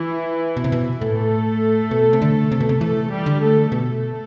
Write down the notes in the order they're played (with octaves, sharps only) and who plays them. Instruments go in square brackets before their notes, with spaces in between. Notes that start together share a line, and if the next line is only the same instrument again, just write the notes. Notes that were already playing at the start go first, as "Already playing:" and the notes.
Already playing: [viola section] E3 E4
[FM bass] B2
C3
B2
[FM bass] A2 [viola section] A3 A4
[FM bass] B2
C3
D3
C3
B2
C3
[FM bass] E3 [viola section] A3 A4
[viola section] G3 G4
[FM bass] D3
[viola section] A3 A4
[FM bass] B2 [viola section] A3 A4